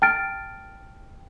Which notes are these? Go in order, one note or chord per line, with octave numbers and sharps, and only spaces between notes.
G5 A5 F6 A6 D7